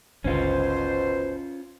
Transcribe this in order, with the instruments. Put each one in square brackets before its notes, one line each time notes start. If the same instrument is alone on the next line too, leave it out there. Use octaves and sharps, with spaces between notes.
[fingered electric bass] G1 C#2 D3 [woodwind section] B2 C5 [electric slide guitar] C#4 F4